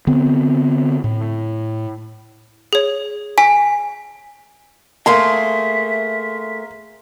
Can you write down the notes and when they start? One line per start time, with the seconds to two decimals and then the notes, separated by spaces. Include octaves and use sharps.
0.07 D3 B3 C4
1.04 A2
2.73 G#4 C#5
3.38 G#5 B6
5.06 A3 A#3 G#4 A#4 E5 F5 C6